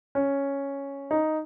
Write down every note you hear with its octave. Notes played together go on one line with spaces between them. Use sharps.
C#4
D#4